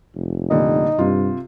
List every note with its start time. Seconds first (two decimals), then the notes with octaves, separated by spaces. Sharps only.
0.15 F1
0.50 A#2 D3 G3 D#4
0.99 G2 C3 F4